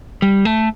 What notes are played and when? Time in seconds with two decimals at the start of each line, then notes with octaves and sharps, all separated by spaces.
0.22 G3
0.45 A3